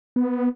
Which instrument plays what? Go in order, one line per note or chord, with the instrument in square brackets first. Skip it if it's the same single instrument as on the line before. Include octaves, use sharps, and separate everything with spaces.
[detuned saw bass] B3